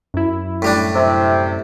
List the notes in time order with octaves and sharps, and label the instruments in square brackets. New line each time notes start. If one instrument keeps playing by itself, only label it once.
[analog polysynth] F#2 E4
[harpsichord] A2 G3 D4
[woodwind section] C3